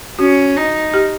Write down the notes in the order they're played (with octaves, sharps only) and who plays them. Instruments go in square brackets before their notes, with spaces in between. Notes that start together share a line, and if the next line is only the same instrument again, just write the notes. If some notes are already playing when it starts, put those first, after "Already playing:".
[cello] C#4 [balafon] F#4
[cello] D#4
[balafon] G4